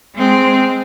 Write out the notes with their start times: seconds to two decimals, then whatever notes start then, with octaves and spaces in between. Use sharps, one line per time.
0.15 G#3 C4